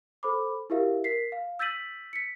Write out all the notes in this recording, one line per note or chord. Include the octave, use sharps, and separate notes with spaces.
A4 C5 B5 D6
E4 F#4 G4 A#4 E5 F5
A#4 B6 C7
F5
E6 G6 A6 B6 D#7 F#7
B6 C#7